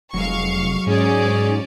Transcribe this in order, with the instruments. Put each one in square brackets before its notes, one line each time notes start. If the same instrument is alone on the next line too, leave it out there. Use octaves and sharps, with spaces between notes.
[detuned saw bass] F1 [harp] F#3 G#3 [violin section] F5 C#6
[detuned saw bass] G#2 [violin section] C#4 D5 [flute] G#4